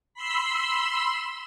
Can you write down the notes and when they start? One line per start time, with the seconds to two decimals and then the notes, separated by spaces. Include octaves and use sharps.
0.14 B5 C6 E6